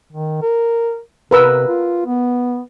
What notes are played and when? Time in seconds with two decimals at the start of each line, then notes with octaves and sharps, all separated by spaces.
0.12 D#3
0.42 A#4
1.31 C3 A#4 B4 E6
1.68 F4
2.06 B3